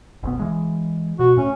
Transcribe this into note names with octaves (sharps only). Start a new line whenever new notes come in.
F#1 B1 B3
E3 G#3
B2 F#4
A2 C#4